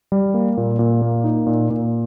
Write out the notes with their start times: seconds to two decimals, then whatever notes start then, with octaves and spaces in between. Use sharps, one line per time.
0.12 G3
0.34 A#3
0.57 A#2
0.79 A#2
1.02 A#3
1.24 D#4
1.47 A#2
1.70 A#2